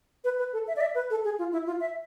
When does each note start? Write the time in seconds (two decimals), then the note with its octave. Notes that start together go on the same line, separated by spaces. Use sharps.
0.24 B4
0.39 B4
0.53 A4
0.68 E5
0.76 D5
0.81 E5
0.95 B4
1.10 A4
1.24 G#4
1.39 F4
1.52 E4
1.67 F4
1.80 E5